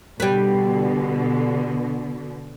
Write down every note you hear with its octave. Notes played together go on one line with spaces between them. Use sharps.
B2 D3 G3 B4